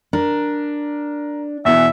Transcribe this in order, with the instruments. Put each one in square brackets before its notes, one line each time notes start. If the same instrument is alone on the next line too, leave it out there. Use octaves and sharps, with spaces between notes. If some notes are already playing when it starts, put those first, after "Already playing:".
[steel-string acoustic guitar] D4 [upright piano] A#4
[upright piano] E2 B2 E3 [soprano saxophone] E5